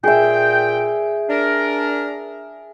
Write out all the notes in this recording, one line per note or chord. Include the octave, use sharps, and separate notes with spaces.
A#2 G#4 E5 G5
D4 A#4